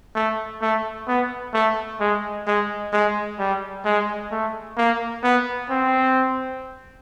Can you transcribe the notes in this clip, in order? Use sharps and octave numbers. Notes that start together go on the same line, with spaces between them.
A3
A3
B3
A3
G#3
G#3
G#3
G3
G#3
A3
A#3
B3
C4